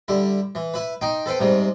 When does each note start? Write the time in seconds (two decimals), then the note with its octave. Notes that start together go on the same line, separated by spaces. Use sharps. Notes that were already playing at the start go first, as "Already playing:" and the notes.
0.08 D3 G3 E4
0.55 E3
0.74 E4 B4
1.01 D#4 G5 C6
1.26 A4 B4 C5 G5
1.40 G#2 C3 G3